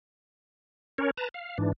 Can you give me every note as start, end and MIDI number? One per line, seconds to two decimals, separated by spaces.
0.98 1.11 61
0.98 1.11 70
0.98 1.11 73
1.17 1.29 71
1.17 1.29 81
1.17 1.29 82
1.34 1.58 77
1.58 1.72 44
1.58 1.72 52
1.58 1.72 62